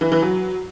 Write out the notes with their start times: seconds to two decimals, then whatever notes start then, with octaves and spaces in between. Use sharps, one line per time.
0.01 E3
0.12 E3
0.22 F#3